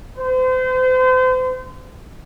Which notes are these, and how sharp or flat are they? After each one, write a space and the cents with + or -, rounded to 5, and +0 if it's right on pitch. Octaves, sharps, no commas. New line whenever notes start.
C5 -35